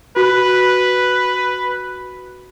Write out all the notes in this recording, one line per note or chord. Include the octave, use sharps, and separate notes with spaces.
F#4 B4